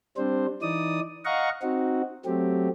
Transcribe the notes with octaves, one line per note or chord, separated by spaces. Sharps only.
G3 C4 D4 C5
E3 D#4 D5 D#6
D#5 F5 F#5 A#5 C#6
C4 D#4 F#4
F#3 A3 C4 G4